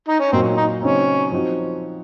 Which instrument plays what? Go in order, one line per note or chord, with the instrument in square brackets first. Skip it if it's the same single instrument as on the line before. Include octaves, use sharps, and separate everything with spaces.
[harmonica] D#4
C#4
[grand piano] A#2 F#3 A#3 D#4 F#4 [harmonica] C4
[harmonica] D#4
[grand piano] C#3 F#3 C4 D#4 [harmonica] C#4
[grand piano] F3 C4 D#4 F#4